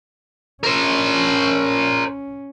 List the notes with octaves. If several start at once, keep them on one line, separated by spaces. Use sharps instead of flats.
C#4 A#4 C5